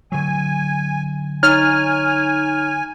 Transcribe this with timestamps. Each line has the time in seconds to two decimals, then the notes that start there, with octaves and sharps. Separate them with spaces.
0.12 D3 F#3 G#5
1.43 D#4 C#5 G#5 F6